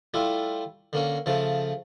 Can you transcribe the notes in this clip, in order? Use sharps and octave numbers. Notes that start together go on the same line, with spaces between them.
G3 A3 E4 F4
D3 A#3 C#4
C#3 F3 A3 A5